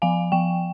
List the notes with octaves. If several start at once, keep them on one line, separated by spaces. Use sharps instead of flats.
F3 F5 G#5
F3 G5